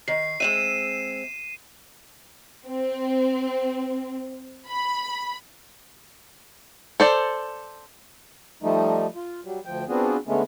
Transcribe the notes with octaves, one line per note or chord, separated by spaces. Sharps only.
D#3 C7
G#3 C4 E5 D#7 E7
C4
B5
A4 C5 D5
F3 G3 A3 D#4
F4
F#3 G3
D2 F3 G5
B3 C4 D4 F4 F#4 G#4
D3 G#3 A3 B3 C#4